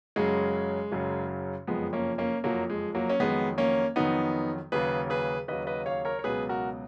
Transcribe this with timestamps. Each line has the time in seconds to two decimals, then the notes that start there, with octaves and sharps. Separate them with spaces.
0.16 F#1 F#2 C#3 F#3 G#3
0.92 F#1 F#2 C#3 F#3
1.67 F#1 F2 F3 G#3 B3
1.93 A#3 C#4
2.18 A#3 C#4
2.44 F#1 F2 F3 F#3 A#3
2.70 G#3
2.95 F#3 A#3
3.10 C#4
3.20 F2 D#3 F#3 G#3 B3
3.58 A#3 C#4
3.96 F2 D#3 F#3 B3 D#4
4.72 D#2 C#3 F#3 G#4 B4
5.10 G#4 B4
5.48 D#2 C#3 F#3 B4 D#5
5.67 B4 D#5
5.86 C#5 F5
6.05 A#4 C#5
6.19 C#5
6.24 C#2 B2 F#3 G#4 B4
6.49 F#4 A#4